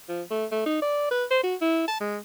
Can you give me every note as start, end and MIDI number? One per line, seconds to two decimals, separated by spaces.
0.09 0.22 53
0.31 0.45 57
0.52 0.62 57
0.66 0.81 63
0.82 1.07 74
1.11 1.24 71
1.31 1.39 72
1.43 1.55 66
1.61 1.85 64
1.88 1.97 81
2.01 2.18 56